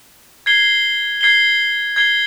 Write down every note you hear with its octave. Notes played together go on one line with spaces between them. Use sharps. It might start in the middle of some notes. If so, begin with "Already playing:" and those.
G#6 C7 G7
G#6 C7 G7
G#6 C7 G7